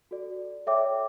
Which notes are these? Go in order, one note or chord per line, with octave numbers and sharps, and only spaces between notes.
F#4 A4 D5
A4 C#5 E5 G5 D6